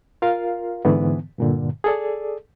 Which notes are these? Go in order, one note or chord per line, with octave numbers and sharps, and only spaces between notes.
F4 A#4 F5
G#2 D3 E3 B3
G2 A#2 D3
G#4 A4 D5